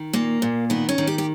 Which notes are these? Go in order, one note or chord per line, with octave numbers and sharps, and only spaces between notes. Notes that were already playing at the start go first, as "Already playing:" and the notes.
Already playing: D#3
A#2 A#3
A#2
D#3 B3
C#4
D#3
G4
G4